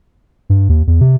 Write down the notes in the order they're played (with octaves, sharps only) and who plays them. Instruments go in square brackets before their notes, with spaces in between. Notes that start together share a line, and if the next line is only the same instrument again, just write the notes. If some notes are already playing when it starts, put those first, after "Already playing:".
[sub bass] G2
D#2
E2
C3